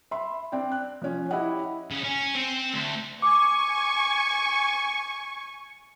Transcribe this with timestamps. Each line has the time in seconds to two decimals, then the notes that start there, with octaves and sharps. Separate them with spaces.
0.11 E5 B5 C6
0.52 C4 D4 D5 G5
0.72 F#6
1.02 F3 C#4
1.31 E4 G4 C#5 D#5 F#5
1.91 C#3
2.04 C#4
2.35 C4
2.73 D2
3.22 G#5 C#6 D6